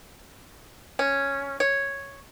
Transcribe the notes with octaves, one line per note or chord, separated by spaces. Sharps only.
C#4
C#5